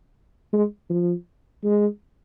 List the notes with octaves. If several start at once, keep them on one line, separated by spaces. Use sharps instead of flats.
G#3
F3
G#3